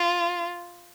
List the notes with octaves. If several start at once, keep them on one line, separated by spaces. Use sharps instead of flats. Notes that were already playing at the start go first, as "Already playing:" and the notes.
Already playing: F4